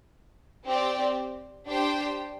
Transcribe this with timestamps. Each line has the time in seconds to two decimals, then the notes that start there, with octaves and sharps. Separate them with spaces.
0.66 C4 G4 D5
1.66 D4 G4 C5 G5